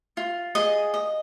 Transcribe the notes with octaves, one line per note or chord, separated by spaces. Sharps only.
F4
G#4 D#5
D#5